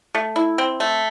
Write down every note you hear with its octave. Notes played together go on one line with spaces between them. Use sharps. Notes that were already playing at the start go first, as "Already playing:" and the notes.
A3
E4
C4
A3